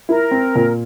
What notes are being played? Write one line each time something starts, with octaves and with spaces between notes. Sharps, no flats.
E4 A#4
C4
A#2